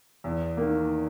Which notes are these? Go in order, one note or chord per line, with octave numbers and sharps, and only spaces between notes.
E2
D#3 A#3